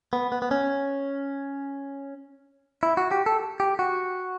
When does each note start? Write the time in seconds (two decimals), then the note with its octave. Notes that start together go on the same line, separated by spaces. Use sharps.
0.13 B3
0.32 B3
0.42 B3
0.51 C#4
2.83 E4
2.97 F#4
3.11 G4
3.26 A4
3.60 G4
3.79 F#4